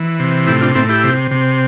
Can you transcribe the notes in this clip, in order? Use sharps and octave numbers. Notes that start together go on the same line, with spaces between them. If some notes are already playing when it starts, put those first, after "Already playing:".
Already playing: E3
C3
A2 E4 G4
D4 F4
A2 C4 E4
E4 G4
C3
C3